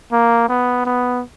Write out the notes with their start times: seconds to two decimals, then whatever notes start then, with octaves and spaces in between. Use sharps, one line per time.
0.12 A#3
0.48 B3
0.85 B3